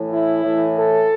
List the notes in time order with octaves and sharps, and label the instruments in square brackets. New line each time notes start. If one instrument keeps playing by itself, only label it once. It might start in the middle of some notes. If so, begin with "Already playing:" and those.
Already playing: [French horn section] A2 E3
E4
A2 E3
A4